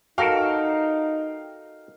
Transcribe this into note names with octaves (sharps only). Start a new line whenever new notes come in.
D#4 F#4 A4 A#4 F5 G5 F6